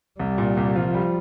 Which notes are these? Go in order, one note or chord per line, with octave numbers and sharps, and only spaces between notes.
C2 G3
A#2
C2
F3 F4
G3